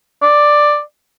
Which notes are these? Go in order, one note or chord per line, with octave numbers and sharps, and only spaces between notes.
D5